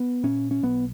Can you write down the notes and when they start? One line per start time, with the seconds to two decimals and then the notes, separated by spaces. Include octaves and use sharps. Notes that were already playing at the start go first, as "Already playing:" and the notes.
Already playing: B3
0.23 A#2 C#4
0.51 C#4
0.63 B1 B3